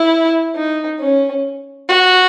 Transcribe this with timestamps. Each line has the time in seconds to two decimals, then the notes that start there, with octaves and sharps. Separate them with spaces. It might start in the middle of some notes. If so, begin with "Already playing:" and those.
Already playing: E4
0.55 D#4
1.00 C#4
1.89 F#4